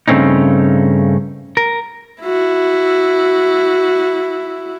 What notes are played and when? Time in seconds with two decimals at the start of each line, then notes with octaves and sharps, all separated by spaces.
0.08 G2 C#3 A3 C4 C#4 D#4
1.57 A#4
2.22 E4 F#4